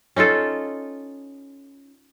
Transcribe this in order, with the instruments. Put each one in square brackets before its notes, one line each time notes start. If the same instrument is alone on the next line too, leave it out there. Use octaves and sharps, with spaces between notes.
[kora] C#4 D#4 F4 A4